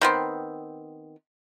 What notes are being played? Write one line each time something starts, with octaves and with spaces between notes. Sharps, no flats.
D#3 B3 C4